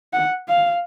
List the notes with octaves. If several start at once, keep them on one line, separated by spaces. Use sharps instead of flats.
F#5
F5